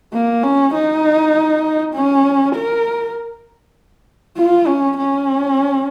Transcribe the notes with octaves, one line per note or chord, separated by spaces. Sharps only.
A#3
C#4
D#4
C#4
A#4
F4
C#4
C#4